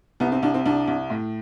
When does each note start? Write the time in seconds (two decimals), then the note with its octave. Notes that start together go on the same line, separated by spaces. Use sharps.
0.20 C2 B3
0.32 C4
0.43 C2 D4
0.54 C4
0.65 C2 D4
0.88 C2
1.10 A2